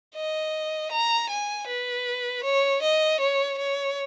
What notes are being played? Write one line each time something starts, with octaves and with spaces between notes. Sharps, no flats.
D#5
A#5
G#5
B4
C#5
D#5
C#5
C#5